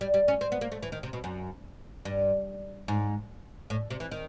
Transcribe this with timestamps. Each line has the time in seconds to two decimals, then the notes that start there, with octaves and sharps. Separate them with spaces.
0.01 G3
0.14 G3
0.28 C#4
0.41 C4
0.52 B3
0.61 A#3
0.72 A3
0.83 E3
0.92 D#3
1.03 C3
1.13 B2
1.24 F#2
2.05 G2
2.88 G#2
3.70 A2
3.90 C3
4.00 E3
4.11 D#3